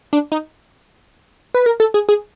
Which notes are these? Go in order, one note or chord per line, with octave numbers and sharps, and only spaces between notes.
D4
D#4
B4
A#4
A4
G#4
G#4